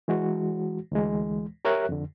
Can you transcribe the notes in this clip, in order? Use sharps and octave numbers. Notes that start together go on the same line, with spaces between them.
E3 G#3 F#4
D2 E3 G#3
G4 A#4 C#5 E5 F#6
F2 D3